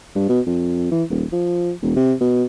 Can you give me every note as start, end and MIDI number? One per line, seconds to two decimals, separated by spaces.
0.16 0.28 43
0.29 0.41 47
0.46 0.88 41
0.91 1.03 52
1.10 1.24 27
1.33 1.73 53
1.82 1.96 28
1.96 2.14 48
2.21 2.44 47